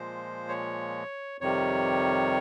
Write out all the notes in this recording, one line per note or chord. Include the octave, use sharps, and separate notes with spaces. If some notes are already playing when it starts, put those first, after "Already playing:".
Already playing: A#2 F3 G#3 C5
C#5
F2 C3 D#3 G3 C#5